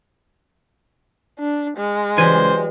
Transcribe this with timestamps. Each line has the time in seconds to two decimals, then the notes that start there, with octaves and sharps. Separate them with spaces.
1.39 D4
1.77 G#3
2.17 C#2 E3 F#3 G3 C5 G#5